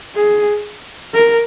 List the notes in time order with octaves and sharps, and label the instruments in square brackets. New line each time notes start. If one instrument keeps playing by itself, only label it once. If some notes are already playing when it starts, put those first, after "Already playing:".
[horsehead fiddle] G#4
A#4